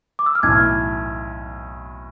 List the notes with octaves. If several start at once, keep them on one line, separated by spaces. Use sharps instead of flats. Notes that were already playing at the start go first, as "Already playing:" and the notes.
D6
E6
F6
B1 A2 E3 G#6